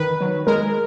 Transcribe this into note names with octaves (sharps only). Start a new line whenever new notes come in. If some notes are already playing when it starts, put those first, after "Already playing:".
Already playing: D#3 B4
F#3
G#3 A#4